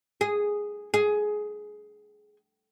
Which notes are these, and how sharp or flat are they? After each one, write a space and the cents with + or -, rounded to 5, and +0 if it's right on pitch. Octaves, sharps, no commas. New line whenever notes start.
G#4 -5
G#4 +15